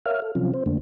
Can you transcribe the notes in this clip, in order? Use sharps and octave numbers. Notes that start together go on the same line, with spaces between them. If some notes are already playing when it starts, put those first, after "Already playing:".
A#4 C#5 E5 F5 F6
A4
C3 F3 F#3 C4 C#4 F4
C4 C5
F2 D3 A3 A#3 D4